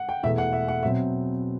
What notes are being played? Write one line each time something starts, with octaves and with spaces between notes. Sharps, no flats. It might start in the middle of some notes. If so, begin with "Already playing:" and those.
Already playing: F#5
G5
E2 B2 A3 E5
F#5
E5
F#5
B2 F#3 C4 E5